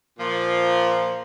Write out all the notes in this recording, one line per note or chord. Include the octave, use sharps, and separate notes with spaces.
A#2 F3